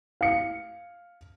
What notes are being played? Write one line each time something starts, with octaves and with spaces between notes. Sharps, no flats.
F5 C#7